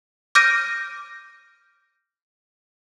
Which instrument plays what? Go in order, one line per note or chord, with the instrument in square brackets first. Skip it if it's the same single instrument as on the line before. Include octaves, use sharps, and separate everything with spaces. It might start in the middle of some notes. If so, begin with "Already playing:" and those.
[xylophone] D6 F6 G6 A#6 D7 D#7